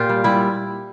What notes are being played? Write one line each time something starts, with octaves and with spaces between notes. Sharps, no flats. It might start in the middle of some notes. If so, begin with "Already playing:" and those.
Already playing: A#2 F4 G4
G3
G3 E4